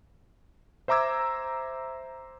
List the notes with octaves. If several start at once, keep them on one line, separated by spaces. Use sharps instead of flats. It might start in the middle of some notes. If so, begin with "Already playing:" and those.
C5 E5 A#5 D6 E6 G#6